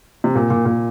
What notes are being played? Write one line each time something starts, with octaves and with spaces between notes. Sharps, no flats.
C3
A#2
A#2
A#2